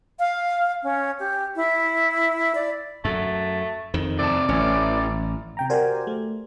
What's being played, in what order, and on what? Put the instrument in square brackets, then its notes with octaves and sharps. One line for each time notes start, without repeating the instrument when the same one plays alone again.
[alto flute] F5
C#4
G4
E4
D5
[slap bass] F#2 [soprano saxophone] A3
[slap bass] F2 D#3
[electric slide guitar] C3 A5 [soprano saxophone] D5
[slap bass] A1 [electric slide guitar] E3 C#4
[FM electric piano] C3 G5 A#5
F#4 G4 A#4 C5 D5 G#5
A3